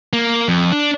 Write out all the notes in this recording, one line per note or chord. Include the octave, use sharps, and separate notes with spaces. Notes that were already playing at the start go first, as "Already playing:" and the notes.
A#3
F2
D4